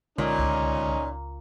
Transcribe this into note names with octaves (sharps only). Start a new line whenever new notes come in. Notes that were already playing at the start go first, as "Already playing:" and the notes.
C2 A#2 D3 G#3 C#4 D#4
C#2